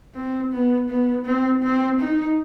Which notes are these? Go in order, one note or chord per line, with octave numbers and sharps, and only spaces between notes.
C4
B3
B3
C4
C4
D#4